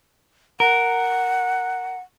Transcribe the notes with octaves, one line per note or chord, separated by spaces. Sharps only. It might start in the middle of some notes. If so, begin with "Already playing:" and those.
A#4 F#5